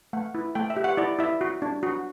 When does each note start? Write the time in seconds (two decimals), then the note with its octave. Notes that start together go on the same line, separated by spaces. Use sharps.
0.13 A3 F#5
0.35 E4
0.55 A3 G5
0.70 E5
0.77 G4
0.84 F#5
0.97 E4 D5
1.19 E4 E5
1.41 F#4
1.62 D4
1.83 F#4